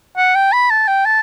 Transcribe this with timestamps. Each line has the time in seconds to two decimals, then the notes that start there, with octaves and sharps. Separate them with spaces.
0.17 F#5
0.35 G5
0.53 B5
0.70 A5
0.88 G5
1.06 A5